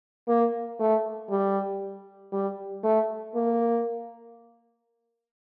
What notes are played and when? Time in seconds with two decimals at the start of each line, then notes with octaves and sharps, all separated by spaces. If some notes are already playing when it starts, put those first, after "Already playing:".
0.28 A#3
0.79 A3
1.30 G3
2.32 G3
2.84 A3
3.35 A#3